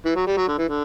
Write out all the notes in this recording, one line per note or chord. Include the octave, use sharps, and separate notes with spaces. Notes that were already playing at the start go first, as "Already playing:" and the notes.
E3
F#3
G3
F#3
D3
E3
D3